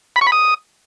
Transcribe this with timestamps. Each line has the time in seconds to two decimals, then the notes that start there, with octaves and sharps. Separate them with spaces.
0.16 B5
0.21 C#6
0.27 B5
0.32 D#6